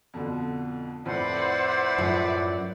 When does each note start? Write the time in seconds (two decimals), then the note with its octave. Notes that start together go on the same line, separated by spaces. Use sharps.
0.14 F2 B2 D3
1.05 F2 A2 E4 B4 C5 D5 F#5
1.98 F#2 A2 F3